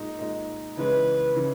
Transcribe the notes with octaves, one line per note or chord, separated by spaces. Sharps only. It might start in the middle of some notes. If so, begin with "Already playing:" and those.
Already playing: A#2 G#3 D#4
A#2 G#3 D#4
C#3 E3 G#3 B4
C#3 E3